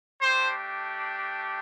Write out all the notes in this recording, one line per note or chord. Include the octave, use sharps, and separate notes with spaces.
A3 D4 G4 C5